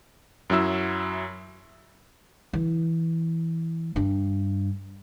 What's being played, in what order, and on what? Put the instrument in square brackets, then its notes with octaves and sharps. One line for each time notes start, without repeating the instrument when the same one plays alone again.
[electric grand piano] F#2 F#3 E4 E6
[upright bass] E3
G2 D4